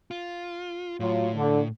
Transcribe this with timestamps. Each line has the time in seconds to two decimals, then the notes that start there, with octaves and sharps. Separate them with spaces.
0.11 F4
1.00 A2 F#3 F4
1.35 D3